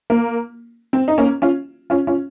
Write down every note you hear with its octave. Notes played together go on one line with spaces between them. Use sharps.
A#3
C4
D#4
A#3 C#4
C#4 F4
C#4 F4
C#4 F4